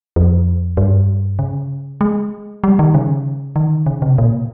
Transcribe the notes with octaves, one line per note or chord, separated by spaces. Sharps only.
F2
G2
C#3
G#3
G3
D#3
C#3
D#3
C#3
C3
A#2